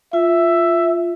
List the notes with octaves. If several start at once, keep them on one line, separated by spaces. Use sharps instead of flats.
F4 E5